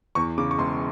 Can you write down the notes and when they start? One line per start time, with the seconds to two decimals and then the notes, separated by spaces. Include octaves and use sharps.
0.15 E2 C#6
0.38 C#3 D6
0.51 C#6
0.58 E1 C6